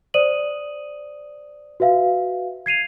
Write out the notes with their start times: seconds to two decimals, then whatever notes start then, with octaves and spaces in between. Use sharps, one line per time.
0.14 C5 D5 D#6 D#7 F#7
1.80 F#4 B4 E5 F5
2.66 G#6 C7 D#7 F7